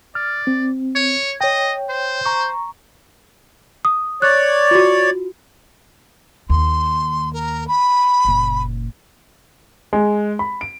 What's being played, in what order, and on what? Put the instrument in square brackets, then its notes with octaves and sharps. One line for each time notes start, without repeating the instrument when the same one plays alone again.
[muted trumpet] D5 [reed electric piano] F6
[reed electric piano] C4
[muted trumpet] C#5
[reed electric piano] C#5 G5 [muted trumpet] D#5
[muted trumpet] C5
[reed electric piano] A#5 C#6
[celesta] D#6
[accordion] C#5 D5 [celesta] F#6
[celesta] F4 F#4
[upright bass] D#2 [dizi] C6
[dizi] A#4
B5
[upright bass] F#1 A#2
[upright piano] G#3
B5
D7